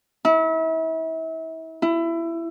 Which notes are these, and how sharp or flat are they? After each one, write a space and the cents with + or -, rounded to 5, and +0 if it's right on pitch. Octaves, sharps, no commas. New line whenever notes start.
E4 -35
E4 +20